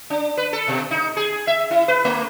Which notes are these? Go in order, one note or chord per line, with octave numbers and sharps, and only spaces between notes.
D4
B4
A4
B2
D#4
G#4
E5
E4
B4
A3